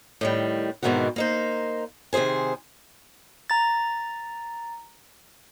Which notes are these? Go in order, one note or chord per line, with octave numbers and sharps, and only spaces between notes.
A2 D#3 G3
G#2 B2 D#3 E3 C4 F#4
A#3 D#4 C5
C3 D#3 G#4 C5 G#5
A#5 A6